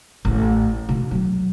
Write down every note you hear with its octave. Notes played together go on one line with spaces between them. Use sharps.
A1
B2
F#3